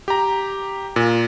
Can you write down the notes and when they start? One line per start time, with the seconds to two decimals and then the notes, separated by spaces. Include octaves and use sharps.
0.08 G4 A#5
0.96 A#2